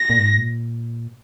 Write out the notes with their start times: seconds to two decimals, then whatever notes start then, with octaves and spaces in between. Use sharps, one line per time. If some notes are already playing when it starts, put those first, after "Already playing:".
Already playing: A#6
0.10 A#2
0.18 G#2
0.38 A#2